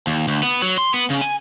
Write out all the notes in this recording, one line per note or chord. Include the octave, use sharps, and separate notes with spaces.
D#2
D2
B3
F#3
C6
B3
C#3
G#5